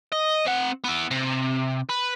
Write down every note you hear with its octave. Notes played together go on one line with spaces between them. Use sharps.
D#5
C4 F#5
B3 E4
C3
B4